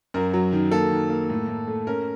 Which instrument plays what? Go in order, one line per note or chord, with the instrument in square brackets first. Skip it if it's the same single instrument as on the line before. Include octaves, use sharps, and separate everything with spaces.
[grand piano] F#2 A#4
F#3
D#3
A#3 A4
D#3
A#3
A2
A2
A3
C#4 A#4